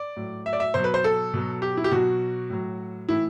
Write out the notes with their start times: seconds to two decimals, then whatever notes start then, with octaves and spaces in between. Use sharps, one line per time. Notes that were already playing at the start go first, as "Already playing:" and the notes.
Already playing: D5
0.16 A2 F#3
0.46 E5
0.53 D5
0.60 E5
0.74 B2 F#3 C5
0.84 B4
0.94 C5
1.04 A4
1.34 B2 F#3
1.62 G4
1.77 E4
1.84 G4
1.91 B2 F#3 F#4
2.50 A2 F#3
3.09 A2 E3 E4